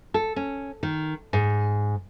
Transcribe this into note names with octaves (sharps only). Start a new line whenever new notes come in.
A4
C#4
D#3
G#2